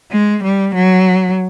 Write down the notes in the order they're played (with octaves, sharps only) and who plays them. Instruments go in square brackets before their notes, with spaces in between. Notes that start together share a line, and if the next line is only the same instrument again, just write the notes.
[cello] G#3
G3
F#3